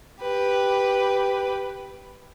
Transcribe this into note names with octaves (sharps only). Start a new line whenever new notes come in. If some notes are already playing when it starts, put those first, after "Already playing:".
G4 B4